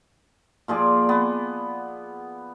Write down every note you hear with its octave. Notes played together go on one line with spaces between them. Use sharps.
A#2 F3 G#4 D5
B3